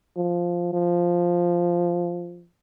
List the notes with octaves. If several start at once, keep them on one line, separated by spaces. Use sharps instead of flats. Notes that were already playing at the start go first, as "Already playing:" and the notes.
F3
F3